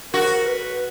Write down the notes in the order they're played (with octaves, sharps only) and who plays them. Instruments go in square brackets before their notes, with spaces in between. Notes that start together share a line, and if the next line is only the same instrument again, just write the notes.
[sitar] F#4 [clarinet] A#4
[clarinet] B4